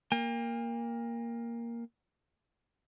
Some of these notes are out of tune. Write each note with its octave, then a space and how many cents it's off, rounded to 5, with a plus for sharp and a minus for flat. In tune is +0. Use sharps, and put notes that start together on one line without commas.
A#3 +0 G5 +45